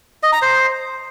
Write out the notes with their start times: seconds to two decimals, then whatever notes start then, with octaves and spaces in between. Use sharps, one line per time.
0.23 D#5
0.32 A#5
0.42 C5